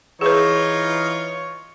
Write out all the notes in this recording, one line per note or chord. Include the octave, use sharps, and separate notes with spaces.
E3 D#4 F4 G#4 B4 C#5